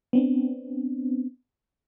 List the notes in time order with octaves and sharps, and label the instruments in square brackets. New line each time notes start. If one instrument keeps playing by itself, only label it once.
[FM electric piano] B3 C4 D4